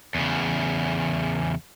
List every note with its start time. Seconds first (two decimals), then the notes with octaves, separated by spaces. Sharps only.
0.15 E2 C#3